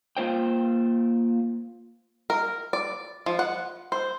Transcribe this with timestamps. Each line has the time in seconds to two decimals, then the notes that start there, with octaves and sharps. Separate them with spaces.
0.17 A#3 F4 C5 G5
2.30 A#4
2.73 D5
3.26 F3
3.39 F#5
3.92 C5